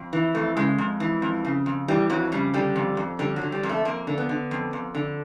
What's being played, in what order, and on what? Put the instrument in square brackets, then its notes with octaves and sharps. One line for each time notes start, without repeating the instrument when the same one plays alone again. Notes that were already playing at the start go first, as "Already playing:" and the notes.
Already playing: [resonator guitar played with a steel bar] F2
E3
F2 A3
C#3 G#3
F2
E3
F2
C#3
F2
E3 G3
F2 F#3
C#3 G3
D3 G3
F2
F2
D3 G3
F#3
D3
G3
F2
A3
F2 A#3
D3
B3
D3
F2
F2
D3